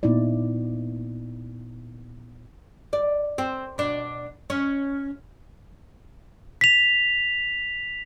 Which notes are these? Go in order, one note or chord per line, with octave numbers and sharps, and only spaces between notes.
A#2 B3 D#4 E4 D5
D5
C4
B2 D4
C#4
B6 F7